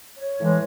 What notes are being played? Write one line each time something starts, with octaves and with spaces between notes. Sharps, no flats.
C#5
A2 E3 G#3